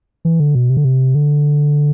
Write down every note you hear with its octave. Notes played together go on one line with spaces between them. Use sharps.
E3
D3
B2
C3
D3
C3
D3